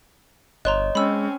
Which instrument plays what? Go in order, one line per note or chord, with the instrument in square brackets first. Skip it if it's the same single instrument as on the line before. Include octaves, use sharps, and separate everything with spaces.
[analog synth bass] G1 [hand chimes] C#5 D#5 [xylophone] A#5 C6 F#6
[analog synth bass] G#3 [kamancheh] C4 C#4 [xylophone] B5 E6